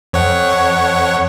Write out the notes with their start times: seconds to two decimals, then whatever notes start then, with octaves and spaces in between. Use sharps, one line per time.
0.13 F2 C#5 F#5